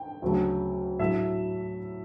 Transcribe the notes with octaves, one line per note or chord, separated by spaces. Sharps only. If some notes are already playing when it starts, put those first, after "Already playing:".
Already playing: G5
D2 C#3 F#3 A3
A2 F#3 A3 E5